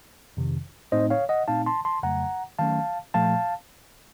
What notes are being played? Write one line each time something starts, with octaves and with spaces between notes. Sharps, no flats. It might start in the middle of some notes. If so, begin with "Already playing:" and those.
F2 C3 D#3
A2 A3 C4 D#4 C5 D#5
C#5 F5
D#5 F#5
A#2 A3 C4 D#4 F5 A5
A5 C6
A5 C6
F2 C#3 F#3 A3 F#5 A#5
D#3 F#3 A3 C#4 F5 A5
A#2 F3 A3 F5 A5